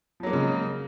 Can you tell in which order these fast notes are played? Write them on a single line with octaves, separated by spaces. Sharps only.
F3 F#3 A#3 G#3 C#3